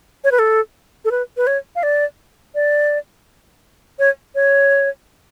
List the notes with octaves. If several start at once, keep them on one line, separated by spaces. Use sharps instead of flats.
C#5
B4
A4
A4
B4
B4
C#5
F5
D5
D5
C#5
C#5